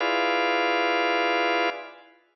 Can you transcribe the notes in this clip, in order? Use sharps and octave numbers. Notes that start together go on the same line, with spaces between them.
E4 F4 G#4 B4 D5 F5